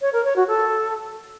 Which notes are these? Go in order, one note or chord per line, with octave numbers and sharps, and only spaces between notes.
C#5
A#4
C#5
F#4
A4